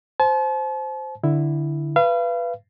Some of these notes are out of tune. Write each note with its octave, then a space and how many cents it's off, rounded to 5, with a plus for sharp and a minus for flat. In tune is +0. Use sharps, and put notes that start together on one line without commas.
C5 +0 A5 -40
D3 +0 E4 +0
B4 +0 F5 -35